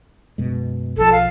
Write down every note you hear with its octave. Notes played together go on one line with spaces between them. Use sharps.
F#2 B2 G#3
B1 E3 F3 A4
F5